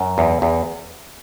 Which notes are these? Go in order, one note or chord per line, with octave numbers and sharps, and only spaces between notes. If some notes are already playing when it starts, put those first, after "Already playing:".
Already playing: F#2
E2
E2